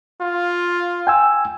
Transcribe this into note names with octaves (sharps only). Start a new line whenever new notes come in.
F4
G5 G#5 E6